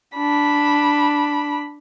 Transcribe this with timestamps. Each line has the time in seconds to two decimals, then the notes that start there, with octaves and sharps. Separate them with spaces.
0.17 D4 B5